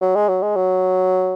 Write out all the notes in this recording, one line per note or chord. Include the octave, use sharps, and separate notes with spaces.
F#3
G#3
F#3
G#3
F#3